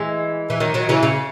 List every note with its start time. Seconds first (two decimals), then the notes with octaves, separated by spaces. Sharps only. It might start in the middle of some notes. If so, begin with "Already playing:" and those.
Already playing: E3 G#3
0.50 E3
0.60 D#3 F#3
0.74 D#3 F#3
0.89 C#3 E3
1.03 C#3